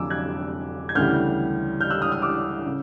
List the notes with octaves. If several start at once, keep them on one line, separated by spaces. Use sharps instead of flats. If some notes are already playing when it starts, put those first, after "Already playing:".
Already playing: F1 F2 D3 F#3 G#5 A#5 D6 E6
F#6 G#6
G#6
D2 C#3 E3 G3 F6 G6
F6 G6
E6 F#6
D#6 F6
D#6 F6
D6 E6
C#3